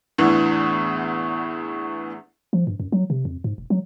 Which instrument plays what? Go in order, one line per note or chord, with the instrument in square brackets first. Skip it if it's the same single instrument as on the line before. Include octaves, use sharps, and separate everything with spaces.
[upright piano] E2 A2 D3 E3
[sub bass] F3
G2
F#2
F#3
C3
F2
G#2
E1
F#3